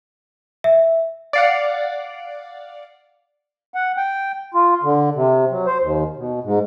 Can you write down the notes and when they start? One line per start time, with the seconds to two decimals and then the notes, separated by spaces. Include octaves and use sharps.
0.64 E5
1.33 D5 F5 F#5
3.74 F#5
3.97 G5
4.54 F4
4.83 D3
5.15 C3
5.51 F#3
5.67 C5
5.82 D#2
6.16 B2
6.44 G#2